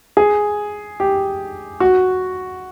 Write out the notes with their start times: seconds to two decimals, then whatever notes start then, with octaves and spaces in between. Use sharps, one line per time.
0.17 G#4
1.00 G4
1.80 F#4